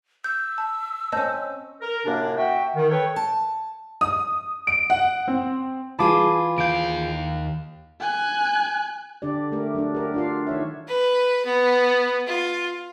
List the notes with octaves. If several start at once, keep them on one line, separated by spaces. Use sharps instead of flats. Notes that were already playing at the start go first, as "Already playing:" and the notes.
E6 G6
A5
C4 C#4 D#5 A5 G6
A#4
F#2 A2 C3 A#3 D4
F#4 E5 G5
D#3
A4 B4 C#5 G5
A5
D#6
D7
F#5
C4
E3 F4 G#4 A5 B5 D6
D#2 F5 G6 D7
G#5 F#6
D3 D4 G4 D5
A3 G4 A#4
F#3 D4
G4 A#4
D4 F4 F5
D#3 C#5 E5
B4
B3
F4